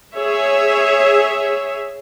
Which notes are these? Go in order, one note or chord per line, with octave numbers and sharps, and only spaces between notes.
G#4 C#5 E5